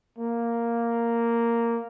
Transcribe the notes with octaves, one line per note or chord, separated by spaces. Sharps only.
A#3